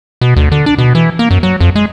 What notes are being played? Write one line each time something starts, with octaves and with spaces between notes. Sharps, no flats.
B2
D2
D3
D4
B2
E3
A#3
F#2
F#3
F2
G#3